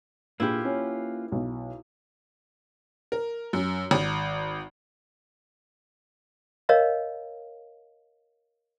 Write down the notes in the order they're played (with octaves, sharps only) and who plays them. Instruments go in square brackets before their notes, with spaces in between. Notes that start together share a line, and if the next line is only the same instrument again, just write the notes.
[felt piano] A#2 D4 G#4 [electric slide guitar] A#3 F4 B4 [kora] E4 G4
[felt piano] C#4
B1
[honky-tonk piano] A#4
F#2
G#1
[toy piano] A#4 C#5 D#5 F5 A#5